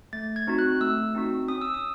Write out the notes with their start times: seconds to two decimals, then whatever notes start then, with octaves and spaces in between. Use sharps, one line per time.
0.13 A3 A6
0.36 G#6
0.47 C4 D#4 F#4
0.58 F#6
0.80 A3 E6
1.15 C4 D#4 F#4
1.48 C#4 D#6
1.61 E6
1.74 D#6